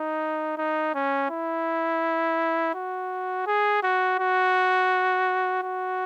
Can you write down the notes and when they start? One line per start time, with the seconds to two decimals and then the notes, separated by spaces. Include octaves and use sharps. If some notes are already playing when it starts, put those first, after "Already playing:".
Already playing: D#4
0.57 D#4
0.94 C#4
1.30 E4
2.74 F#4
3.47 G#4
3.83 F#4
4.19 F#4
5.63 F#4